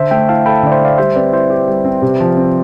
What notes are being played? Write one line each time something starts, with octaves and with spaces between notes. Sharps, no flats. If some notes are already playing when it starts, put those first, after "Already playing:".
Already playing: D3 C5 E5
A3 E5 G5
E4 F5 A5
A4 G5 B5
D3 D5
C5 E5
A3 D5 F5
G3 C5 E5
C4 B4 D5
E4 C5
G4
G3
C4
C3
F3
C4